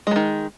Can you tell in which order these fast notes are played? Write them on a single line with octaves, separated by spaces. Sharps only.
G#3 F#3 D#3